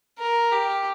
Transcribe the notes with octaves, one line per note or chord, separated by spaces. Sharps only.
A#4
G4